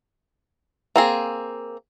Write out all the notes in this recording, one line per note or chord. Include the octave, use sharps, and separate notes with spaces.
A#3 C4 G#4